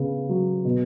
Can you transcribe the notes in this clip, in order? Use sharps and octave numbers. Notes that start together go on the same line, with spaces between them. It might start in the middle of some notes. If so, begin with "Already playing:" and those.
Already playing: C#3 B3
F#3
B2